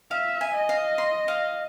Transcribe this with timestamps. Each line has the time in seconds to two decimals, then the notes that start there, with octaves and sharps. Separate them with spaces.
0.11 E5 F5
0.41 G#5
0.54 D#5
0.69 F5
0.98 C6
1.28 F5